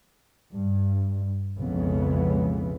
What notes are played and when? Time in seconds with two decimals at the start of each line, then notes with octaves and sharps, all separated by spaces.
0.52 G2
1.57 B1 F2 C#3 E3 G#3 B3